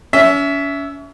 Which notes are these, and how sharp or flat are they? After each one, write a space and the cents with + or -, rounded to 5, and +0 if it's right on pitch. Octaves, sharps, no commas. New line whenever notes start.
C#4 +35 E5 +0